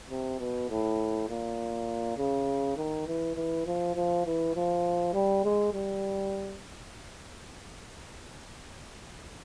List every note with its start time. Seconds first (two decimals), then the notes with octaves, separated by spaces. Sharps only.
0.10 C3
0.39 B2
0.69 A2
1.29 A#2
2.17 C#3
2.77 D#3
3.07 E3
3.36 E3
3.66 F3
3.96 F3
4.26 E3
4.55 F3
5.14 G3
5.44 G#3
5.73 G3